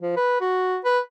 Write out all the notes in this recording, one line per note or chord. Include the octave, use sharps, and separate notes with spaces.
F3
B4
F#4
B4